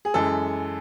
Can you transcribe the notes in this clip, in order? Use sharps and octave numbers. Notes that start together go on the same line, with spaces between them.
G#4
F#2 E3 G#3 A4